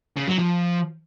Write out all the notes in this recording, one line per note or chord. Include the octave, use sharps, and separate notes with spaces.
C#3
F#3
F3